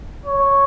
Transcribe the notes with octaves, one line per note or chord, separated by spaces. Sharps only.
C#5